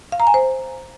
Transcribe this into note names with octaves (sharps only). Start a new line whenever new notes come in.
F5
A#5
G#5
C5